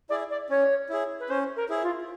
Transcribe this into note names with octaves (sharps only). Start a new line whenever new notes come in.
E4 G#4 D5
D5
C#4 C#5
E4 G#4
B4
C#4 C5
A#4
E4 G#4
F4